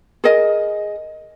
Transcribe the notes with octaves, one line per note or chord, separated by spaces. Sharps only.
G#4 A#4 D#5